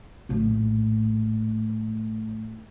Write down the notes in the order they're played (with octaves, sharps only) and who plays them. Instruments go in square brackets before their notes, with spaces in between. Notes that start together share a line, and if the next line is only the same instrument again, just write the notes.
[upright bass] A#1 A2